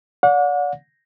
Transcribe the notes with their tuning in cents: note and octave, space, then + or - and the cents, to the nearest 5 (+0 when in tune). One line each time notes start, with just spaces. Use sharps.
D5 -35 F#5 -40